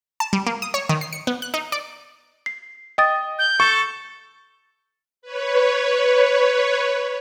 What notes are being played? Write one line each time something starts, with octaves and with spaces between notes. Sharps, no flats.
A5
G3
A#3
D#6
C#5
D#3
C7
C#7
B3
F#6
D#4
D5
C7
D#5 G5 D#6 A6
G6
A4 C#6
B4 C#5